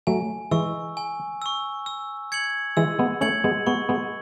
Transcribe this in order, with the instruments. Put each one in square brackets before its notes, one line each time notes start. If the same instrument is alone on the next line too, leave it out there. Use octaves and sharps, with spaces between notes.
[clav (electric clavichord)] F#3 A3 [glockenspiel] G#5
[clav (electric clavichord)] E3 G#3 [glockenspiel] C#6 E6
[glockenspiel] G#5
C#6 E6
E6
G#6 C#7 F#7
[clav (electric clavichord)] E3 G#3 [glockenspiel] E6
[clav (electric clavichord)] G#3 B3
[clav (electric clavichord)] A3 C#4 [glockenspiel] G#6 C#7 F#7
[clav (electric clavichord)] G#3 B3
[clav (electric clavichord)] G#3 B3 [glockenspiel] C#6
[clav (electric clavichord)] G#3 B3